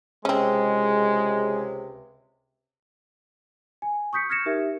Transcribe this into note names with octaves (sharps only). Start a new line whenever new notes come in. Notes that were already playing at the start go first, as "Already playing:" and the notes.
C#2 C3 G#3 C4 C#4
G#5
C#6 D#6 G6 B6 C#7
F6 G#6 A#6 C#7 E7
D#4 G4 A#4 E5